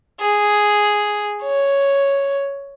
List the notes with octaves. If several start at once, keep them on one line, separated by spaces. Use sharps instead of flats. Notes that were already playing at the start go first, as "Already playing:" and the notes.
G#4
C#5